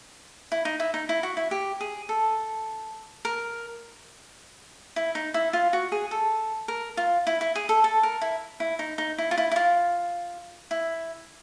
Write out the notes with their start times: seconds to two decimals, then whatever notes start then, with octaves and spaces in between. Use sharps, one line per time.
0.52 E4
0.65 D#4
0.80 E4
0.94 D#4
1.09 E4
1.23 F#4
1.37 E4
1.51 G4
1.81 G#4
2.09 A4
3.25 A#4
4.96 E4
5.15 D#4
5.34 E4
5.53 F4
5.73 F#4
5.92 G#4
6.11 A4
6.68 A#4
6.97 F4
7.27 E4
7.41 E4
7.55 G#4
7.69 A4
7.84 A4
8.03 A#4
8.21 E4
8.60 E4
8.79 D#4
8.98 D#4
9.18 E4
9.31 F4
9.38 E4
9.51 E4
9.56 F4
10.71 E4